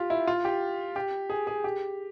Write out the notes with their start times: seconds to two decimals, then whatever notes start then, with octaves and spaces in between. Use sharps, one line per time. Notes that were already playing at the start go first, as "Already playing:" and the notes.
Already playing: F4 G4
0.10 E4
0.27 F4
0.45 G4
0.96 G4
1.30 G#4
1.47 G#4
1.64 G4